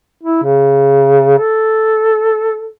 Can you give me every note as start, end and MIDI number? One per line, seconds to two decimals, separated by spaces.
0.23 0.44 64
0.44 1.35 49
1.39 2.72 69